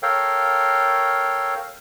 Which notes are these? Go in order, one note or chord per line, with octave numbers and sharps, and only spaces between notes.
A4 A#4 C#5 F5 G5